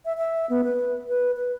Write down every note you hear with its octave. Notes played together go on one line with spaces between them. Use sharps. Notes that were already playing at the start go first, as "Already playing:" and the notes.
E5
E5
B3
B4
B4
B4